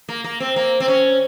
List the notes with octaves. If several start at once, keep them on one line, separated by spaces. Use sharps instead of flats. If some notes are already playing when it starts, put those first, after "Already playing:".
A#3
A#3
C4
A#3
C4
C#4